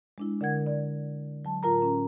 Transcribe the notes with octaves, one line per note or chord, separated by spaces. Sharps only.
G#3 D4 E4
D3 A#4 F#5 G#6
D5
F#3 A5
A2 F4 A#4 A#5
C#4